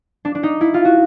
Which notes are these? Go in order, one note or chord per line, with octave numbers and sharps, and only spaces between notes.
D4
D4
D#4
E4
F4
F#4